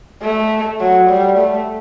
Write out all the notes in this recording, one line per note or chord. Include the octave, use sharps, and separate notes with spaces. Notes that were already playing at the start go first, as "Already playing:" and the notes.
A3
F#3
G3
A3